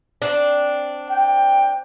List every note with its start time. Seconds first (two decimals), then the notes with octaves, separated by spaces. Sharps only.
0.22 C4 D4
1.10 G5